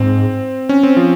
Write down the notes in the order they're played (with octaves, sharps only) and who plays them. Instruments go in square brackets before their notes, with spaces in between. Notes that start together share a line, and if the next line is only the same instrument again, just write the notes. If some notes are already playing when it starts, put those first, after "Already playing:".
Already playing: [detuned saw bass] G#2 [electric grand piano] C4
[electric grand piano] C#4
C4
F3